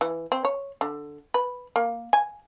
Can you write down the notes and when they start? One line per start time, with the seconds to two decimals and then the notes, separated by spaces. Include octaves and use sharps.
0.01 E3
0.32 C4
0.45 C#5
0.81 D3
1.34 B4
1.76 A#3
2.13 G#5